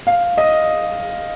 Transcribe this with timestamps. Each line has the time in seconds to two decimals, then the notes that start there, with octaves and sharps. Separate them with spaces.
0.07 F5
0.38 D#5